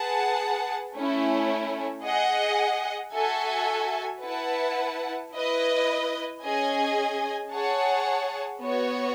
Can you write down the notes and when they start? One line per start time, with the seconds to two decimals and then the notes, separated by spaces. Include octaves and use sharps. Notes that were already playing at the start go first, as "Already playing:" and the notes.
Already playing: G#4 B4 F#5 A5
0.95 A3 C#4 E4
2.03 G#4 D#5 F#5
3.13 F#4 A4 E5 G#5
4.22 E4 B4 F#5 A5
5.33 E4 B4 D#5
6.42 C#4 G#4 D#5 G#5
7.51 G#4 C#5 F#5 A5
8.60 B3 F#4 C#5